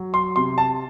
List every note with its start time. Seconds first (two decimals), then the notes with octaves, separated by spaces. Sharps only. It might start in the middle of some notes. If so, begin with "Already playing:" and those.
Already playing: F#3
0.14 C6
0.36 C3 C6
0.58 A5